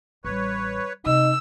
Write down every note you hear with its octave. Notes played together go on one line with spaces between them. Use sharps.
A1 G3 B4 C#5
C3 D#4 E6